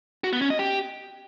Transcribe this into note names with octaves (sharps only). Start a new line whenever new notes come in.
F#4
B3
C#4
D#5
G4